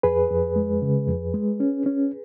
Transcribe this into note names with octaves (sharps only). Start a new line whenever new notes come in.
F2 G#4 B4
F2
G#3
C#3
F2
G#3
C#4
C#4